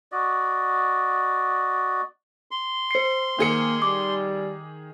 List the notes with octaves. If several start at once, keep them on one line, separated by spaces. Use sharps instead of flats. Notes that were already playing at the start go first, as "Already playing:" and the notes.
F#4 D5 D#5
C6
C5 C7
D#3 A#3 G#4 C#7
G3 D6